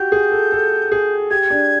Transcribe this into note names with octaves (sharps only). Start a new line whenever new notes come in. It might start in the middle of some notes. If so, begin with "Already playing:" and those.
Already playing: F#4 G4 G6
G#4
A4
A4
G#4
G4 G#6
D4